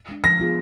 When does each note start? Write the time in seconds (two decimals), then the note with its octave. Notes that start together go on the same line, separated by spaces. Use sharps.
0.09 G#3 D4
0.24 F3 A#6
0.40 B3 F4 G#4